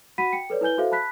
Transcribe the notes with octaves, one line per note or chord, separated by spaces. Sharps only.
F#4 F#5 B5 B6 D#7
G5 C#7
A4 B4 C#5 D5
E4 B4 G#5 G6 G7
F#4 A4 C5 E5 F5
A5 B5 F#6 B6